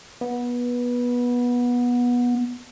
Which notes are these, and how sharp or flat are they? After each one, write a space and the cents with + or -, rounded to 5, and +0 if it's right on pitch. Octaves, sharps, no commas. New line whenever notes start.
B3 -20